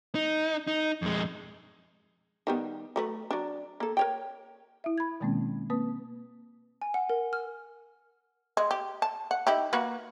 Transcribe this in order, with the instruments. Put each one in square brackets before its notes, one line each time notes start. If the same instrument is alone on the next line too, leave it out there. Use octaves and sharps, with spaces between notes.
[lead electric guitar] D#4
D#4
F2 G#3
[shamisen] D#3 G3 B3
F#3 A3 B4
F#3 D4
A#3 A4
A#4 C#5 G5
[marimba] E4 E5
B5 G#6
B2 D#3 G#3 A#3 C4 C#4
A#3 C4 B4 D#6
[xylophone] G#5
F#5
A#4
F6
[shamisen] G#3
G4
A5
F#5
D#4 E4 G4
A#3 F#4 B4